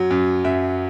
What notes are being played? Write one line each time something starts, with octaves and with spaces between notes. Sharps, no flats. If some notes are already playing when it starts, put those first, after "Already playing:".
Already playing: F#2 F#3
F#2
F#2 E5